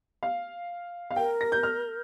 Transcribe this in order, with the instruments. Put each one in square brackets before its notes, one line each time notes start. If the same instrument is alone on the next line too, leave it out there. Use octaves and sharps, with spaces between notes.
[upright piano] F5
F5
[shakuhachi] A#4 [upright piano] G5
[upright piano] A#6
G6
F6